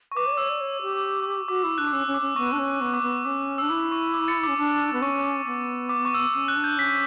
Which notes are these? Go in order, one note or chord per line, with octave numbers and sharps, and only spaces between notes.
C#6
B4 D6
C#5
D5
C#5 E6
D5
C#5
G4
F#4 D6
E4 E6
D4 F#6
D6
C#4 E6
C#4
D6
C#4
B3 C#6
D4
C#4
B3 C#6
D6
B3 C#6
C#4 D6
D4 E6
E4 D6
C#6
D6
A6 C#7
D6
C#4
D4 D6
B3
C#4 C#6
D6
B3 D6
D6
C#6
E6
D6
C#4 E6
F#6
D4
G6
C#4 B6